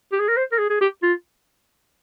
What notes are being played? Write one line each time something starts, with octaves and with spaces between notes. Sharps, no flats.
G4
G#4
A#4
C5
A#4
G#4
G#4
G4
F4